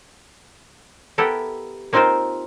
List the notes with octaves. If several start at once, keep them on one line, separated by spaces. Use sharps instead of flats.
B3 E4 G4 A4 A#4
A#3 C4 D#4 F4 A#4 C5